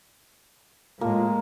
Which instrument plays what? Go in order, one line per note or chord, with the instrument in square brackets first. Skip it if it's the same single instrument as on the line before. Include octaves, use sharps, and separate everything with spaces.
[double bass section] A2 G#3 [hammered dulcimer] A#3 [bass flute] F4